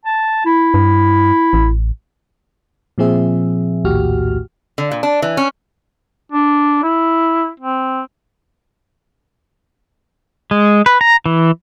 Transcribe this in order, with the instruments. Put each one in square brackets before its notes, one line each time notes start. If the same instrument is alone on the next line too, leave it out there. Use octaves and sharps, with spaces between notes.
[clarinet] A5
E4
[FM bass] G2
A1
[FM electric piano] A#2 F3 C4 G#4 E5
A#1 D#2 A2 F#4 G4 F6
[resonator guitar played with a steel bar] D3
A#2
D4
E3
C#4
[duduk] D4
E4
C4
[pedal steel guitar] G#3
B4
A#5
E3